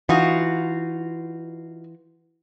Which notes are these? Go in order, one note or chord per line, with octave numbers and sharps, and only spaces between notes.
E3 D#4 F4 F#4